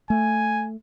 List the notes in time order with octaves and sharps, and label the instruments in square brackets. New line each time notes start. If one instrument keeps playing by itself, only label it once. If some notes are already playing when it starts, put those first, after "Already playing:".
[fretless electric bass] A3 [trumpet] G#5